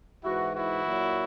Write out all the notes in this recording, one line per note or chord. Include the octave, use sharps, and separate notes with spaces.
G#2 E3 E4 F#4
E4 F#4
A#2 F#3